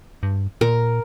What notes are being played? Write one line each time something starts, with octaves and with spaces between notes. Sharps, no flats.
G2
A#2 A#4